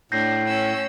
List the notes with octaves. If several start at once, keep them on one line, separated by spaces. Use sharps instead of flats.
A2 D4 G6 A#6 C7
C#4 E6